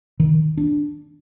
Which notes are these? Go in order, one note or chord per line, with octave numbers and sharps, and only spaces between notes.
D#3
D4